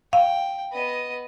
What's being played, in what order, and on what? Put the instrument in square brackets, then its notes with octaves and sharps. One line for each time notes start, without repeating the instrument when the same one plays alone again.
[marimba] F5 [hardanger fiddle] G5
[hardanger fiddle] B3 D#5